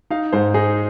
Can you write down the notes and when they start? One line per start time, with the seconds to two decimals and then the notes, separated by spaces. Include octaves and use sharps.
0.10 D#4 F5
0.32 G#2 C5
0.54 D#4 G#4